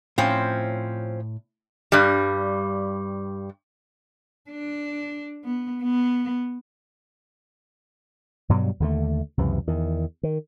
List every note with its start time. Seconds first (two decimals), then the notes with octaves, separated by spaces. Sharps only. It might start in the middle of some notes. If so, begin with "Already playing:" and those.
0.18 A2 F3 C4 C#4
1.92 G2 G3
4.50 D4
5.45 B3
5.83 B3
8.49 G2 B2 F#3 G3
8.80 D#2 D3 A3
9.37 C#2 F#2 C3 E3
9.67 E2 D#3
10.23 D#3